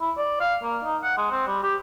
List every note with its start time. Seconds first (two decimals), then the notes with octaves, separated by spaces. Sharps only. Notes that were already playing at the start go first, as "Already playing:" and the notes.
0.01 E4
0.17 D5
0.40 F5
0.63 A#3
0.84 D#4
1.03 F#5
1.17 G#3
1.31 C4
1.47 G3
1.63 G4